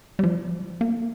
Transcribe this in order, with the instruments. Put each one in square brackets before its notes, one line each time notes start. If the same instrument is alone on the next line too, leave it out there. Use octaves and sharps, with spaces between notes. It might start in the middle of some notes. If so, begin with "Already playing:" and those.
[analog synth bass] G3
F3
A#3